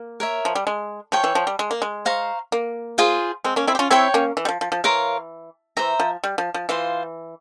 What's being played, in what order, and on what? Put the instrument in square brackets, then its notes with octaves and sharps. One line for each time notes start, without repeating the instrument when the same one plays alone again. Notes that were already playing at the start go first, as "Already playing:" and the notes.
Already playing: [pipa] A#3
[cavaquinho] A#4 C#5 E5
[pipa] F3
G3
G#3
[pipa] F3 [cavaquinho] C#5 G5 C#6
[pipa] E3
F3
G3
G#3
A#3
G#3
[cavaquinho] C5 F5 A#5 C#6
[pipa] A#3
[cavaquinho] F4 G#4 C5 F5
[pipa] G#3 C4
A#3 C#4
C4 E4
G4
C#4 F4
[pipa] C4 E4 [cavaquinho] C#5 G5 C#6
[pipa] A#3 C#4
E3
G3
F3
F3
F3
[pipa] E3 [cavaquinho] A#4 C#5 F5 C6
[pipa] E3 [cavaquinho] C5 E5 A#5
[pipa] F3
G3
F3
F3
[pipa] E3 [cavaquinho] F4 C5 F5